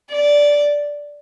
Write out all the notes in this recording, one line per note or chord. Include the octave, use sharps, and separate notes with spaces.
D5